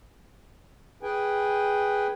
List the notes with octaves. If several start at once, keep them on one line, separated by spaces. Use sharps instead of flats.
G#4 B4 G5 G#5